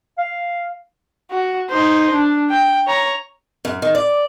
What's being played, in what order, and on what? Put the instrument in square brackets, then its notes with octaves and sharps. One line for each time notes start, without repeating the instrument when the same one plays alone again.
[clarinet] F5
[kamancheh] F#4
D#4 C5
D4
G5
C#5 A#5
[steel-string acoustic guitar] F#2
D#3
D5